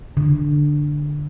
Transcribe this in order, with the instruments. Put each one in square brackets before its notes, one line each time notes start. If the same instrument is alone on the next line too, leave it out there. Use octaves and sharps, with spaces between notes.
[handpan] D3